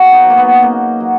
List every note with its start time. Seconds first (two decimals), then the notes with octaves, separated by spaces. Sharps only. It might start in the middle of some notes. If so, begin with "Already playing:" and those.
Already playing: B2 F#4 G#4
0.12 D#4
0.25 F#3
0.30 A#3
0.38 B3
0.63 C#3 A#3
1.00 F#3